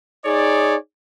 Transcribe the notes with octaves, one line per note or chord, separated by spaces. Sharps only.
D#4 G#4 C#5 D5